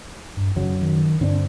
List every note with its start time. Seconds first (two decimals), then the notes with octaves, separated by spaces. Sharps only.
0.37 G2
0.56 F#2 C#3 F#3
0.82 D#3
1.21 G2 D3 C4 D4